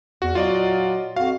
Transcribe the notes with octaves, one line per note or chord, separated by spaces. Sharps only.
E2 F#4
A#2 F#3 F4 F#4 D5 D#5
F2 F#4 F5